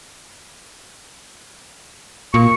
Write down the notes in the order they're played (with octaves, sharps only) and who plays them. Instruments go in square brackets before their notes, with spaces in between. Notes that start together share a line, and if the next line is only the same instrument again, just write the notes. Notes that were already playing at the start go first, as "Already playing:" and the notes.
[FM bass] A#2 [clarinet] C#6